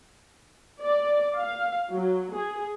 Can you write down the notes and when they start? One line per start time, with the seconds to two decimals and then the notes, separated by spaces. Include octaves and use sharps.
0.84 D5
1.39 F5
1.92 F#3
2.36 G#4